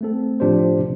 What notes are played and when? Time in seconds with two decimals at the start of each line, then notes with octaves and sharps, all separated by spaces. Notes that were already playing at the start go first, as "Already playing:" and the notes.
0.01 A3 C4 A4
0.40 A2 F3 D4 G4 C5
0.79 C3